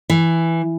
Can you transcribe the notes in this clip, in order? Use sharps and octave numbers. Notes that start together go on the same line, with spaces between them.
E3